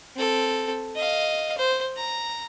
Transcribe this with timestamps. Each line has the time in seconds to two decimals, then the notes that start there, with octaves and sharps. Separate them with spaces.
0.16 C4 A4
0.95 D#5 F5
1.57 C5
1.97 A#5